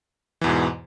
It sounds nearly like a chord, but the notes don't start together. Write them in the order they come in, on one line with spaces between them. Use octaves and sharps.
E3 E2 B2 G#2